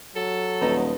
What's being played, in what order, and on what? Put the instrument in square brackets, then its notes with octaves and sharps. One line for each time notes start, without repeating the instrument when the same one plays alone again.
[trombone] F#3 [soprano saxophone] A4
[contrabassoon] D#1 [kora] B3 D#4 D#5